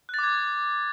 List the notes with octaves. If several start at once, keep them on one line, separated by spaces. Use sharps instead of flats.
D6 F#6 G#6 A6